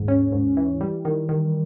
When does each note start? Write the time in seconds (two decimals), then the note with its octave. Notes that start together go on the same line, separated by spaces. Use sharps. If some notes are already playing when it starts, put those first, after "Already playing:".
Already playing: D#2 G#2
0.08 C#4
0.32 G#2
0.57 E3
0.81 G3
1.05 D#3
1.29 D#3